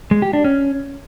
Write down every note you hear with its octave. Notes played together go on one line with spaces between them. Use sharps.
G#3
G4
D4
C#4